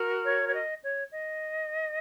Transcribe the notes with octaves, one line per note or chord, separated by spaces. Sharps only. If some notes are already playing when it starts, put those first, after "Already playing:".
Already playing: F#4 A#4
C#5
C#5
D#5
C#5
D#5